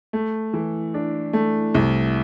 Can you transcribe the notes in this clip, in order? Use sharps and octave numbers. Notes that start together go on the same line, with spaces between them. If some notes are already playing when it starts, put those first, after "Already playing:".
A3
E3
D4
A3
C2